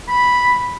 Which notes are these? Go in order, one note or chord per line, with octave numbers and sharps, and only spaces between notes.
B5